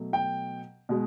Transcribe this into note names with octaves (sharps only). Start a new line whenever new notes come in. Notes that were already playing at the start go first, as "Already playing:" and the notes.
Already playing: B2 F#3 A3
G5
B2 G#3